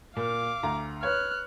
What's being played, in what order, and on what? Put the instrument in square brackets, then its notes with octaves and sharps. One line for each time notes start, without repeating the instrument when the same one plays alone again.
[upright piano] A#2 [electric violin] F5 D6
[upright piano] D2 A#5
[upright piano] B4 C#5 [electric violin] F6 F#6